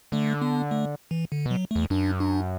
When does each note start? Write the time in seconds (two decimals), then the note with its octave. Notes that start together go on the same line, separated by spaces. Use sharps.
0.12 D3 A3
0.42 B3
0.71 A3
1.11 E3
1.32 D3
1.46 B2
1.51 F#3
1.71 E2 A3
1.90 F#2 D4
2.20 D4